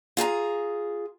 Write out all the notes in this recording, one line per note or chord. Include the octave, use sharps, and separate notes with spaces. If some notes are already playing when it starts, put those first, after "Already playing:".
F4 G#4 A5 A#5